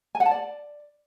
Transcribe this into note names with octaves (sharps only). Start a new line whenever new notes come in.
G#5
F#5
A5
D5